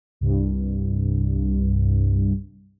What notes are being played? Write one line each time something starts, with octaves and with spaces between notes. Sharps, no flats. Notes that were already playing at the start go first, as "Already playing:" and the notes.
C2 G2